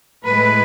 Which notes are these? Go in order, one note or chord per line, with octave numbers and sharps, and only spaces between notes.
A2 G#3 B4